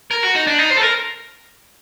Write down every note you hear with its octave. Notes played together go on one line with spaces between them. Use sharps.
A#4
F#4
D#4
D4
D#4
C5
A4
A#4